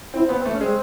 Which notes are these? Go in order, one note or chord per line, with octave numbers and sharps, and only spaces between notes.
C4 E4
C4
B3
C4
A3
C#4
G#3 C4